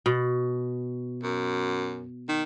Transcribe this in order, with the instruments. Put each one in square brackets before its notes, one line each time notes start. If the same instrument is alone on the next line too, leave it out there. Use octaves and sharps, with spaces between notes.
[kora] B2
[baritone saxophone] F#2
D#3